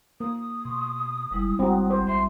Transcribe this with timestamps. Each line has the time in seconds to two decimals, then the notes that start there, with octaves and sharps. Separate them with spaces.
0.20 A#3 D#6
0.65 B2 C6 C#6
1.31 F#1 G3 G#3 E4
1.59 G#1 G3 C4 F#4 G5 A#5
1.90 C5 C6 D6
2.07 A1 C4 E5 C6